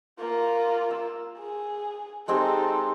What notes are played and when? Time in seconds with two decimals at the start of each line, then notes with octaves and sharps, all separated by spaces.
0.19 A#3 F4
0.91 E6
1.39 G#4
2.28 G#3 C4 D#4 G4 A4